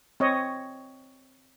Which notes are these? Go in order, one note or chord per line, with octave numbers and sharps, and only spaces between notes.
C4 C#5 D#5